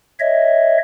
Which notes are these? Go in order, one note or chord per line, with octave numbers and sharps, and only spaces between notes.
C#5 D#5 E5